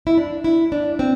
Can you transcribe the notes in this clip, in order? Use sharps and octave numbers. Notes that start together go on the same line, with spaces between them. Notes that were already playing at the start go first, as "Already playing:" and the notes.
E4
D4
E4
D4
C4